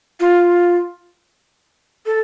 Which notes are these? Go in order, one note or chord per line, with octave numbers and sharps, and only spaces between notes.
F4
A4